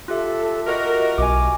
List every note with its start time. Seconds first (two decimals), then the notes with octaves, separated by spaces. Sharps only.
0.08 F4 G4 A4 E5
0.67 F#4 A#4 D#5
1.18 B1 G#5 D6